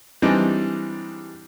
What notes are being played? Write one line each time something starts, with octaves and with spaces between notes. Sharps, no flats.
E3 G3 G#3 C4 D4 D#4